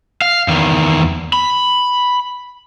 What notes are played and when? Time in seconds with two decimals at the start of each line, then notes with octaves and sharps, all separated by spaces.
0.22 F5
0.48 E2 D#3
1.33 B5